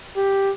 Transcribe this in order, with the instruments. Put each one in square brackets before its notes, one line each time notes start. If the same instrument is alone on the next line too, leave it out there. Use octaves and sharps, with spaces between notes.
[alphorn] G4